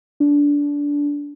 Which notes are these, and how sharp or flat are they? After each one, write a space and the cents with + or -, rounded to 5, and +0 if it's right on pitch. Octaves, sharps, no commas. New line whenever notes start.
D4 -20